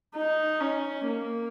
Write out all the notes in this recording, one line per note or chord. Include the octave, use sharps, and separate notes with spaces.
D#4
C#4
A#3